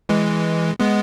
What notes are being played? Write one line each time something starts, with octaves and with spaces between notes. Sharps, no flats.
E3 G#3
G#3 B3